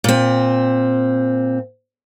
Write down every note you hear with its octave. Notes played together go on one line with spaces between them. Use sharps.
A#2 C4